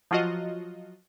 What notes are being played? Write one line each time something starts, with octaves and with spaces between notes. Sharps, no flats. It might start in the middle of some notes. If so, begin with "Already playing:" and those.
F3 F#3 F4 F#4 D#5